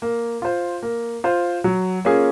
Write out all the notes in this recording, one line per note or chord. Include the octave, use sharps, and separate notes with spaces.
A#3
F4 C5
A#3
F4 C5
F#3
A#3 C#4 F4 G#4